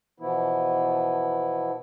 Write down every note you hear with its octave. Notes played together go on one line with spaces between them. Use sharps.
B2 E3 F3 B3 E4